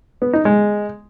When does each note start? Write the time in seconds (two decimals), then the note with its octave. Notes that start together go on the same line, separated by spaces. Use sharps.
0.22 B3
0.33 D#4
0.45 G#3